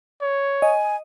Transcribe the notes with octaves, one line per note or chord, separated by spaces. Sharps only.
C#5
D#5 G#5